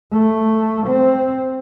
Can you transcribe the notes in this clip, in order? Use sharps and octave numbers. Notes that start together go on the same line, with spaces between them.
A3
C4